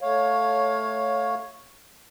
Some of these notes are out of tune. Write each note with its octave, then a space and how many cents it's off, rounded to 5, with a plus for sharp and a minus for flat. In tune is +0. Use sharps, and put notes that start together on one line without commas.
A3 +0 C#5 +0 F5 +20